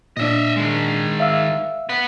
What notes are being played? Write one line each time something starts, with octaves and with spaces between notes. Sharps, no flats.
A#2 D4 D#5 E5
D#3 G#3
E5 F5 E6
B4 F#5